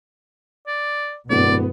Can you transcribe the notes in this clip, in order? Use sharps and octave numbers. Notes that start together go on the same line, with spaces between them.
D5
D1 G2 B2 B3 D5